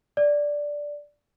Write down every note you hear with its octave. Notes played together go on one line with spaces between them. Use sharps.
D5